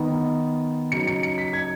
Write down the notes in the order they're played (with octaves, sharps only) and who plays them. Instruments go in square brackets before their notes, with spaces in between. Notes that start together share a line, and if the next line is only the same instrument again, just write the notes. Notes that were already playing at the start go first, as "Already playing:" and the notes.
Already playing: [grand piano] D#3 B3 D#4
C#3 F#3 D#4 C#7
C#7
C#7
B6
G#6